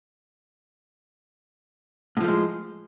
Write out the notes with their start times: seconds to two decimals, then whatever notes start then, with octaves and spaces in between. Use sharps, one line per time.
2.17 A2
2.20 F3
2.24 A3
2.28 G#3